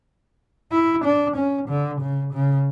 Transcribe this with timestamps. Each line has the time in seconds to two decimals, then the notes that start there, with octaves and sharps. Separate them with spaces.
0.72 E4
1.04 D4
1.36 C#4
1.69 D3
2.01 C#3
2.33 C#3